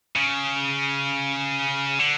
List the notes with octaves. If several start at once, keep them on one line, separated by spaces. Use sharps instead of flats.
C#3
D3